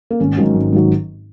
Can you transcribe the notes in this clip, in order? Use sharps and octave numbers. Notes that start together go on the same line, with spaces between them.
A#3
G#1 C#4
G#2 D#3 F#3
G#1
G#2 D#3 F#3